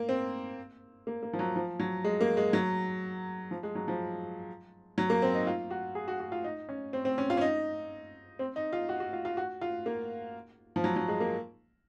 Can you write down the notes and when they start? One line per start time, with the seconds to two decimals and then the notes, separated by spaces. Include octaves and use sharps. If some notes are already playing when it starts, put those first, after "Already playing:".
Already playing: A#3
0.09 C4
1.07 A#3
1.23 A#3
1.33 F3
1.39 F#3
1.56 F3
1.80 F#3
2.05 G#3
2.21 A#3
2.37 G#3
2.53 F#3
3.51 F3
3.63 G#3
3.75 F#3
3.88 F3
4.98 F#3
5.10 A#3
5.22 C4
5.35 D#4
5.47 F4
5.70 F#4
5.95 G#4
6.08 F#4
6.20 F#4
6.32 F4
6.44 D#4
6.69 C#4
6.93 C4
7.05 C4
7.18 C#4
7.30 F4
7.37 C#4
7.41 D#4
8.39 C4
8.56 D#4
8.73 F4
8.89 F#4
9.00 F#4
9.13 F4
9.25 F4
9.37 F#4
9.61 F4
9.86 A#3
10.76 F3
10.84 F#3
10.96 F#3
11.08 G#3
11.20 A#3